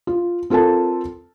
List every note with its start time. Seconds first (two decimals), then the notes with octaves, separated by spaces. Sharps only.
0.07 F4
0.50 C4 F4 A4 A#4 A5